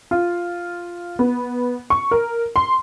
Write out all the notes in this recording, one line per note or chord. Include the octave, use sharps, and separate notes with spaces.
F4
B3
C#6
A#4
C6